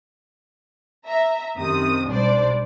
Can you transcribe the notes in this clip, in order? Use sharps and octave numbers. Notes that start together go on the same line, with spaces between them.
E5 A#5
F#2 C3 D#3 D#6
B1 G3 D4 C5 D5